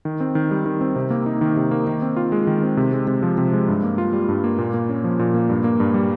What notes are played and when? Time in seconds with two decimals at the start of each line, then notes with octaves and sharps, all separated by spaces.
0.05 D#3
0.20 C4
0.35 D#3
0.51 G3
0.66 D#3
0.81 C4
0.96 C3
1.10 A#3
1.26 D#4
1.41 D#3
1.56 C3
1.71 A#3
1.87 D#3
2.02 C4
2.16 F4
2.32 G#3
2.47 D#3
2.63 C4
2.77 C3
2.92 G#3
3.07 C3
3.23 F3
3.38 C3
3.53 G#3
3.68 G2
3.83 A#3
3.98 F4
4.13 G3
4.29 G2
4.44 A#3
4.58 A#2
4.74 A#3
4.89 C#4
5.04 F3
5.19 A#2
5.34 A#3
5.50 G2
5.64 A#3
5.80 G2
5.94 G3